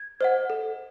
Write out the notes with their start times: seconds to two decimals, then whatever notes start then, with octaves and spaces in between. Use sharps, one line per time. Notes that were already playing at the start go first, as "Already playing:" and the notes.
Already playing: G#6
0.21 C5 D#5 F#5
0.50 A4